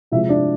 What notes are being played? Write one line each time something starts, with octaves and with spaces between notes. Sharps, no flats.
C3 F3 G#3 E4 E5
D4 D5